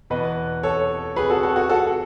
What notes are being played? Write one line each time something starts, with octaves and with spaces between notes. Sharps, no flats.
E2 B2 B4 D#5
A4 C#5
G#4 B4
F#4 A4
F#4 A4
F#4
F#4 A4